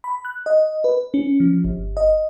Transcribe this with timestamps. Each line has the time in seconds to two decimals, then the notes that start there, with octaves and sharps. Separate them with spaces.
0.04 B5
0.25 F#6
0.46 D#5
0.84 B4
1.14 C#4
1.40 F3
1.65 G1
1.97 D#5